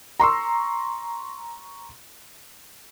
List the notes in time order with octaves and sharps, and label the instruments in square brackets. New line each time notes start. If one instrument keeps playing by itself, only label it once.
[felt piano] A#5 C6 C#6 E6